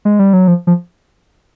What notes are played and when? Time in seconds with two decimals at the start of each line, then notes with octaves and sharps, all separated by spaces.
0.05 G#3
0.19 G3
0.33 F#3
0.48 F3
0.67 F3